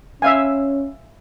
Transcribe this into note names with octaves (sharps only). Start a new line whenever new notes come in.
C#4 E5 F5 G#5